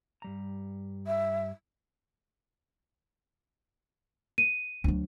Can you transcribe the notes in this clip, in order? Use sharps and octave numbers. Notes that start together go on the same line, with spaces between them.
G2 G3 A#5
E5
D#7
D2 F#3